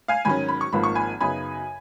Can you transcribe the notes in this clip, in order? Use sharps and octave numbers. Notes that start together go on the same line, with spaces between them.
F5 G#5
G#2 D#3 F#3 C#4 G#5 B5
B5
C#6
G#1 G#2 F3 A#3 B5
C#6
G#5 B5
F#2 C#3 F#3 B3 D#4 G#5 B5